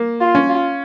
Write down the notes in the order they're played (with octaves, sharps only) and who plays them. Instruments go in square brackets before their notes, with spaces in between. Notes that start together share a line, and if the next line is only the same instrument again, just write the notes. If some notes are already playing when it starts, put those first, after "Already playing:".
Already playing: [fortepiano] A#3
[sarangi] F4
[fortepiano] C#4
[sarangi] F4